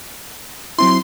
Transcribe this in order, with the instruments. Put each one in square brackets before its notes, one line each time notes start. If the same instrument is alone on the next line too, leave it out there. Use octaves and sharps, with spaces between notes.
[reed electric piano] F#3 C4 E4 [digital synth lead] C6